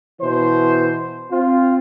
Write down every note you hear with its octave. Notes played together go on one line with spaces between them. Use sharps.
B2 E3 E4 C5
C4 F4